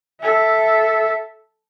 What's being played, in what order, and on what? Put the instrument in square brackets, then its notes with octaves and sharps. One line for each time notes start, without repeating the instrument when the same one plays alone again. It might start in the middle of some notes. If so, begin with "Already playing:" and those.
[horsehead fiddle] A4 E5